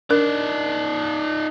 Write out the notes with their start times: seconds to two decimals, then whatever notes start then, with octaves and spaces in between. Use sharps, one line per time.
0.10 D4 D#4 A#4 D5